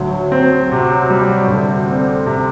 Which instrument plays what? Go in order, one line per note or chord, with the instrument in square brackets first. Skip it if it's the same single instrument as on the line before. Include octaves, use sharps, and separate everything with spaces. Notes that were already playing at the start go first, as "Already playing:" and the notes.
Already playing: [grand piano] D2 [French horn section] F#3
[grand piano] C4
[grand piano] C3 [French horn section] F#3
[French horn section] F#3 [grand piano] G3
[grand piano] D2 [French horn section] D3
[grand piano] C4
C3